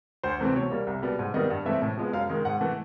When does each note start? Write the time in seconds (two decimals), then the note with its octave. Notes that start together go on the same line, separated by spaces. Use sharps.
0.23 D2 C5
0.40 C3 E3 A3 C4
0.55 B2 C#5
0.71 G3 A#3
0.87 C2
1.02 B2 G3 B3
1.19 G#2
1.34 D#3 G3 B3 D#5
1.50 G2
1.65 E3 A3 C4 E5
1.82 A2
1.97 F3 G#3 B3
2.13 F#2 F5
2.29 D#3 G#3
2.45 G#2 F#5
2.61 E3 A3